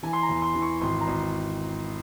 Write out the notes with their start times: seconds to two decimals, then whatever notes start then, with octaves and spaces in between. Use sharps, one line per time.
0.03 E3 G#5
0.13 C6
0.22 A#5
0.29 E2
0.42 C6
0.55 E3
0.62 C#6
0.81 G#1 C6
1.01 A#5
1.07 G#1